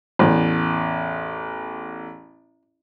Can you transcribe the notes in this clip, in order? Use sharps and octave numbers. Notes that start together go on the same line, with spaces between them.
A1 E2